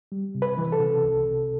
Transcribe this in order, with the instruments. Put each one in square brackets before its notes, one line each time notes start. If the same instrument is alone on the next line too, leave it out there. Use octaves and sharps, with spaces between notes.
[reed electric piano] G3
C3
B4
E3
A4
C3
C2
C3